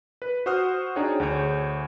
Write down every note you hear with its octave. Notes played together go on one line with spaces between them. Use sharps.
B4
F#4 C5 F#5 D#6 F6
D4 D#4 F#4 G#4 C#5 G5
D2 G#4 C#5 G6